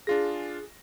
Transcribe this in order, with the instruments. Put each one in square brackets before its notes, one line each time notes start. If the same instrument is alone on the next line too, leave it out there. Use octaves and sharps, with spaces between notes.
[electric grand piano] D4 F4 A#6 [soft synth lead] G#4